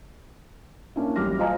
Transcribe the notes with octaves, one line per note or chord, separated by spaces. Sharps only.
A#3 C#4 D4 E4
A1 F#3 G3 D6 F6 A#6
F4 C5 D#5 F5 G#5 A#5